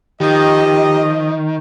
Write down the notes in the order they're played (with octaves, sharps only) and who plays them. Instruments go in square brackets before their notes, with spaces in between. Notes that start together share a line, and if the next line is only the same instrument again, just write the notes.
[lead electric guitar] D#3 [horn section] F3 D#5 [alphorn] G4